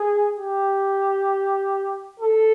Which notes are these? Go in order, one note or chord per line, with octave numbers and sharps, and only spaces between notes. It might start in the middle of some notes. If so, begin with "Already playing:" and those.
Already playing: G#4
G4
A4